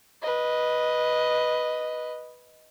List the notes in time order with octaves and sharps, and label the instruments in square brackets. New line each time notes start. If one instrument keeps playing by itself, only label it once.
[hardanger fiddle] B4 D#5